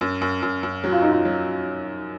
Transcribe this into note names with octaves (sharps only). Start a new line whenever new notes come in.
F#2
F#2
F#2
F#2
F#3 F#4
F4
F#2 D#4
F4
F#3